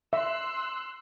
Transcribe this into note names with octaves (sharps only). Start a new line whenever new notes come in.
E5 C6 E6 F#6